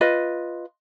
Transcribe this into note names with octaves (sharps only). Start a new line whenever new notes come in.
F4 B4 D#5